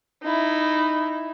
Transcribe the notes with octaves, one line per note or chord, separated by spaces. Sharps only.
D#4 E4